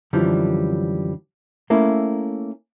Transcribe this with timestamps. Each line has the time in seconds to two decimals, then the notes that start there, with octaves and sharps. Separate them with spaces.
0.13 F#2 D3 E3 F3 G3
1.70 A3 A#3 C#4 E4